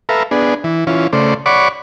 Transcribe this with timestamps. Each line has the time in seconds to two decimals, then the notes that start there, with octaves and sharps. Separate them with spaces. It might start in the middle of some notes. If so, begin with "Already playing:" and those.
0.09 A4 B4 E5 F5 A#5
0.31 B3 D4 G#4
0.64 E3
0.87 E3 C#4 F4
1.13 C#3 A3 C5 D5
1.46 C#5 D5 F#5 B5 C#6 D6